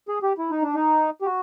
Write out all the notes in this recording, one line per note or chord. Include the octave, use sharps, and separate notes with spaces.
G#4
G4
E4
D#4
D4
D#4
G4
F#4